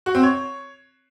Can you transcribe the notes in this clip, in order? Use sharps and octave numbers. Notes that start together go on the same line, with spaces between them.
F#4
C4
C#5